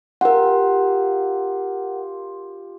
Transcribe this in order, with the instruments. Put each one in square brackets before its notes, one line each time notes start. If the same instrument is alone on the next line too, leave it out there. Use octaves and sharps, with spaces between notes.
[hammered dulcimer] F4 G4 [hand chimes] A#4 F#5